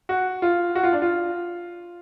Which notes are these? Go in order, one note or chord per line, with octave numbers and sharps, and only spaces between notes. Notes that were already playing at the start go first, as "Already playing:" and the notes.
F#4
F4
F#4
F4
D4
F4